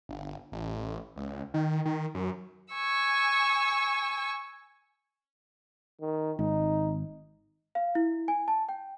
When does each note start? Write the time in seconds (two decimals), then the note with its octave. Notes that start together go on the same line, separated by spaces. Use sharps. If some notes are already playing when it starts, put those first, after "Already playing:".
0.09 G1
0.52 A1
1.16 C#2
1.54 D#3
1.86 D#3
2.15 F#2
2.74 G#5 C#6 E6
6.01 D#3
6.39 G#1 D#4
7.75 F5
7.95 E4
8.28 G#5
8.48 A5
8.69 G5